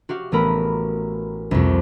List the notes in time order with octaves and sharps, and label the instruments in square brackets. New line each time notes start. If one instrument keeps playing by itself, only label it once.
[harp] F#4 G4 F5
A1 A3 B3 A#4 B5
C2 F2